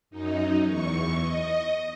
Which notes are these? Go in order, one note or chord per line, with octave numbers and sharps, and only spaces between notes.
F#2 D#4
E2 C#6
D#5